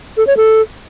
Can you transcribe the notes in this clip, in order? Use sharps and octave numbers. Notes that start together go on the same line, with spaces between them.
A4
C#5
A4